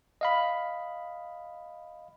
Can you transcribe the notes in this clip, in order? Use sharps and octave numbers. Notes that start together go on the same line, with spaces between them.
D#5 F5 B5